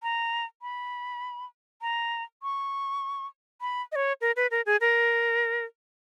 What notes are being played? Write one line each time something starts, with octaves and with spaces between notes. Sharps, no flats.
A#5
B5
A#5
C#6
B5
D#5
C#5
A#4
B4
A#4
G#4
A#4